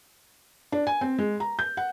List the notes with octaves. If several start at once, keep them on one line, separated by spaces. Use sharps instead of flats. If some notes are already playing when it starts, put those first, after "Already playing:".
D4
G#5
C4
G#3
A#5
G6
F#5